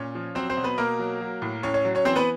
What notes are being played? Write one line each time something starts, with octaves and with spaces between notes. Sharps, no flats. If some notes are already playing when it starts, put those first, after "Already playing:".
Already playing: A#2 C#4 C#5
F3
F#3 C4 C5
C4 C5
B2
B3 B4
B2 A#3 A#4
F#3
F#3
A2
A2 C#4 C#5
C#4 C#5
F#3
C#4 C#5
E3 C4 C5
B3 B4